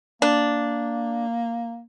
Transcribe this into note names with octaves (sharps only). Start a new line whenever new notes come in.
A#3 D4